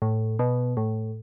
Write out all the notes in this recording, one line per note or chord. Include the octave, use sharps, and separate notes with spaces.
A2
B2
A2